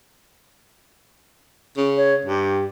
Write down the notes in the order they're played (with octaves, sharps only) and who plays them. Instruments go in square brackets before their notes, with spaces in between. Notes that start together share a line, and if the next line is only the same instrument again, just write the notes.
[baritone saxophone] C#3
[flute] C#5
[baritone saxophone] G2 [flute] G4